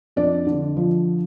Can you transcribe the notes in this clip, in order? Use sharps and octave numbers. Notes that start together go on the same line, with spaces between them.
F2 D4 D5
D3
F3